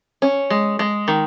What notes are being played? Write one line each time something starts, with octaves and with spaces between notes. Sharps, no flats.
C#4
G#3
G#3
D#3